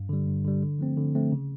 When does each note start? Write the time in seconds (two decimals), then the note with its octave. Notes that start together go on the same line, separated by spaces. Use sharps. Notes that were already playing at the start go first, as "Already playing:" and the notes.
Already playing: G2
0.09 D3 G3
0.27 G2
0.45 D3 G3
0.62 D3
0.79 F3 A3 C4
0.98 D3
1.15 F3 A3 C4
1.32 C#3